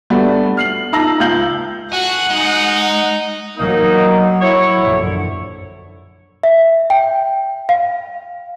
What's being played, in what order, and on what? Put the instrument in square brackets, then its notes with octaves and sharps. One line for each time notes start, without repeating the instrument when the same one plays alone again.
[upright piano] G3 A3 B3 D4 F#4
F6 C7 F#7
D#4 A5 A#5 E6 A#6 F#7
C#2 F5 G6 F#7
[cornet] F#4 [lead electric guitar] A4 G#5 [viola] F#5
[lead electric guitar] G#3 [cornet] D#4
[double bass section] F#3 [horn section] A#3 D#4
[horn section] E4 C#5
[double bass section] A#1 F#2 D3
[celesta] E5
G5
F5